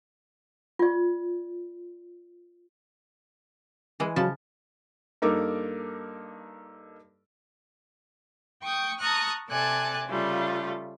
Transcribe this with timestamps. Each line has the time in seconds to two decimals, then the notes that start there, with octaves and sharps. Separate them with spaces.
0.79 F4 D5
4.00 E3 G#3
4.16 C#3 F3 F#3 A5
5.22 G2 A#3 D#4 A4 A#4 D6
8.62 G5 C#6 D#6 G6
8.99 A5 A#5 C#6 D#6 F6 F#6
9.49 C3 A4 D5 G#5 A5 F#6
10.07 C#3 G3 A3 F4